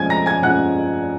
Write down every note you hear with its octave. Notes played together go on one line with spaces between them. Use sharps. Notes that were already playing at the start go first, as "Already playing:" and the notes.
Already playing: F2 F3 G#3 C#4 G#5 G#6
A#5 A#6
G#5 G#6
F2 F3 G#3 C#4 F#5 F#6